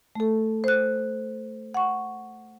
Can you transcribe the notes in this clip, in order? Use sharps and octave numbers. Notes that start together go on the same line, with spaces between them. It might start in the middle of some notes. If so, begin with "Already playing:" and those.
A3 A4
C5 F#6
F#5 C#6